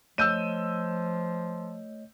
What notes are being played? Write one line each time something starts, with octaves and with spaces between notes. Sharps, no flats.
F3 A3 C#5 D#5 E6 G6 D#7